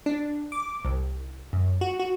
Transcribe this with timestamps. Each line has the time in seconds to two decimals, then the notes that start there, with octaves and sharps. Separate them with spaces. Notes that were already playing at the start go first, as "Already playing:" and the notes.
0.06 D4
0.52 D6
0.85 C2
1.53 F#2
1.81 F#4
2.00 F#4